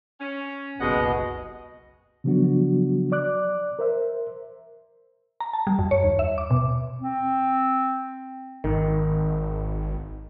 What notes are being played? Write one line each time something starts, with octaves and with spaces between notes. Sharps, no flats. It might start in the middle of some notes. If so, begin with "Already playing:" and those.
C#4
F#1 C2 B2 G3 G#3 D#5 F#5
C#3 F3 F#3 B3 D4 F#4
D5 D6 F#6
A#4 C5 E5
A#5
A5
G3
F#2
C#5
D#2
E5
D6
B2
C4
G#1 D#3